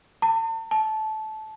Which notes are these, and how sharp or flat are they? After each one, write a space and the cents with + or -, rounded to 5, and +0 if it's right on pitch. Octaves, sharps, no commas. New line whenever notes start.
A5 +40
A5 -20